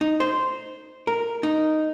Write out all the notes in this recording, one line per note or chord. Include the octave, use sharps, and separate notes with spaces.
D#4
C5
A#4
D#4